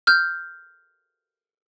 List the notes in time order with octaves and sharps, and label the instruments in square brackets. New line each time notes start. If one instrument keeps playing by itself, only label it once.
[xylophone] F6 G6